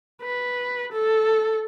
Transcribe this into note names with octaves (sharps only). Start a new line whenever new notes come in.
B4
A4